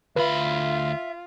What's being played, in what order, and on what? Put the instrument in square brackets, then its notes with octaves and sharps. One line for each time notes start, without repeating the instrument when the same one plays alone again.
[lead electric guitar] D2 B5 [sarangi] F4 [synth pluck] B4 [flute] E5